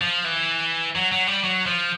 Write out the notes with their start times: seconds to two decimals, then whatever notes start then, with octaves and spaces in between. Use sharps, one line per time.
0.01 F3
0.25 E3
0.96 F#3
1.12 F#3
1.27 G3
1.44 F#3
1.66 F3